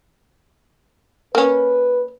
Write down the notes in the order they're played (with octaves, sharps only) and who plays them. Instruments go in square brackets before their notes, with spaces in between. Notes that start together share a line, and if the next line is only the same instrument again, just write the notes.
[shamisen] A#3 C#4 [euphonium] B4